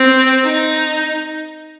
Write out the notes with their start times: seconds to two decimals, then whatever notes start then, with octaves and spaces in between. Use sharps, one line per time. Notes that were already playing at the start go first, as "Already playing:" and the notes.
Already playing: C4
0.43 D#4